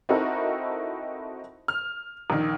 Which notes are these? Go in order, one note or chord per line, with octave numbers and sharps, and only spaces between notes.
C4 D#4 E4 F#4 A4 A#4
F6
A#1 D#3